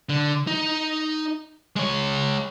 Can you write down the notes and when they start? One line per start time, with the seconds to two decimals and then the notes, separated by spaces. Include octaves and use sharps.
0.09 D3
0.47 D#4
1.76 G#3 C#5